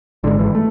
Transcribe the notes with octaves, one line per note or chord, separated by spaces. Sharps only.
G#1 G#2 D3
E3
A3